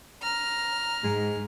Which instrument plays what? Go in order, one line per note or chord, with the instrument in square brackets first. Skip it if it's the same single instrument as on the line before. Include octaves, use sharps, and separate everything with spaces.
[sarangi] A#5 [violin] F6
[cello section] G#2 [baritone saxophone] G#3